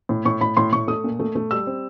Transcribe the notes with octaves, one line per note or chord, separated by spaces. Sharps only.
A2
A2 C#6
A2 B5
A2 C6
A2 C#6
A3 D#6
A#2
A3
A3
G3 E6
C4